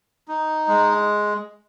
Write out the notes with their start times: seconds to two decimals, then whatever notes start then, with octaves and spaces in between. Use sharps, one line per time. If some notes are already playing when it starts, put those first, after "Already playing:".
0.28 D#4
0.68 G#3